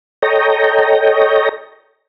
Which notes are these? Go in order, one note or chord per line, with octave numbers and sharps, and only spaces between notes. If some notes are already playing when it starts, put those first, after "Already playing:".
A4 C#5 D#5 G5 A#5